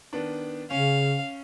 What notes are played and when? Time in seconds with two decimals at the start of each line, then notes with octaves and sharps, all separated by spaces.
0.13 D#3 B3 D4
0.71 C#3 C#4 F5